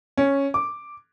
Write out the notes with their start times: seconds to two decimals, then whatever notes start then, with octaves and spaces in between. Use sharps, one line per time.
0.17 C#4
0.54 D6